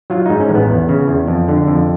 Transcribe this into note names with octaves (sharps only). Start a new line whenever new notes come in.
F#3 F4
G#2 D#4
C#4
A1
B3
E2
C#3
E2
F2
D3
F2